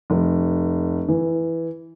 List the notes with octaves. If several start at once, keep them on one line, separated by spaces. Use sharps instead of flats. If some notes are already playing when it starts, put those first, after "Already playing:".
F1
E3